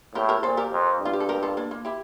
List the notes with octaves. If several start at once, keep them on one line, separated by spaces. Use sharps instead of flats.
A2 G4 A#4
G4 A#4
A#2 A4 C5
G4 A#4
F2
G2
F4
G4
A4
G4 A#4
F4 A4
A#3 D4
A#3
E4 G4